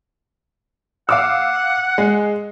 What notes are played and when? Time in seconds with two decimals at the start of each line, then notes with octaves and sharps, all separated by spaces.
1.09 F5 F#5 D6 E6
1.98 G#3